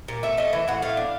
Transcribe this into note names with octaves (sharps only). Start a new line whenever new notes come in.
A#2
A3 E5
A3 D#5
E3 E5
A2 F#5
A3 F5
D4